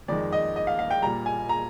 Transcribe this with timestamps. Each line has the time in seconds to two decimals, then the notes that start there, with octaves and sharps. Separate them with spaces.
0.08 F2 D#3 G#3 D5
0.32 D#5
0.56 D#5
0.67 F5
0.79 F5
0.91 G5
1.02 A#2 G3 A#5
1.26 G#5
1.49 A#5